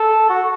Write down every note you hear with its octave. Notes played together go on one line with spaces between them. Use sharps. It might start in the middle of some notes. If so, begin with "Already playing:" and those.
Already playing: A4
F#4